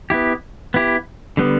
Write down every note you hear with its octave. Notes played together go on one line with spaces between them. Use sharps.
B3 E4 G4
B3 E4 G4
D3 G3 B3